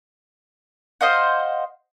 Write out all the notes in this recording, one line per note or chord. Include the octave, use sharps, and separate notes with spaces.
C5 D#5 F5 F#5